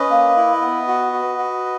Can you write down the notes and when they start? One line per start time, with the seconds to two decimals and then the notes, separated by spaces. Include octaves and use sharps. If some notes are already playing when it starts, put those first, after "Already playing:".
Already playing: C#4 B4 D#5
0.11 A#3
0.37 E4
0.62 B3
0.87 F#4
1.13 F#4
1.38 F#4